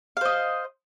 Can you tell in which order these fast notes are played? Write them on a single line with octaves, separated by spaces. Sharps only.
F5 C5 D#5